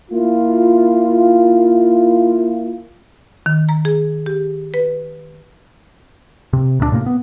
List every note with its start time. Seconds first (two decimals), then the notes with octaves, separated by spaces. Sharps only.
0.11 A#3 E4 F4
3.46 D#3
3.69 A#5
3.85 G#4
4.26 G4
4.74 B4
6.53 C3
6.80 D2 A#2 A3 D4
6.92 A2 C3 A#3
7.06 B3